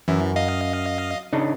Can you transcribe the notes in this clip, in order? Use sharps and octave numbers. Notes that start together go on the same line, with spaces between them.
F#2 E3
D#5 F5
C#3 D4 D#4